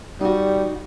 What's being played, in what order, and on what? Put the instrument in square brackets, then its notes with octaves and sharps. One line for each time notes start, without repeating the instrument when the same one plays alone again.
[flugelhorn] G3 [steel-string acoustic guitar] D#4 F#4